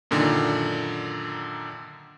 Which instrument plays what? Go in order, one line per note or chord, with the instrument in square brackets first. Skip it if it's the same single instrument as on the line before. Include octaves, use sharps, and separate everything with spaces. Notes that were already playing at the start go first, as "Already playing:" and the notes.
[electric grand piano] F#2 A#2 D3 D#3